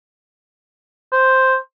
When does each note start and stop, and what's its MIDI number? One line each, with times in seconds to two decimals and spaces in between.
1.12 1.57 72